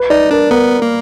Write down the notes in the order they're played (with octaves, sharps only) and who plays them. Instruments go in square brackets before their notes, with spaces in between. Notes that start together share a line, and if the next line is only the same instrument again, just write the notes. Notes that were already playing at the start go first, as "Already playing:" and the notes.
Already playing: [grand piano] B4
[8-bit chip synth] D#4 [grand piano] D5
[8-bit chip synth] D4 [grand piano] A#4
[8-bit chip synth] B3 [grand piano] A#4
[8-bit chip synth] A#3